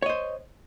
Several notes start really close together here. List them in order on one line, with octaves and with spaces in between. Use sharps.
C#5 D#5 C5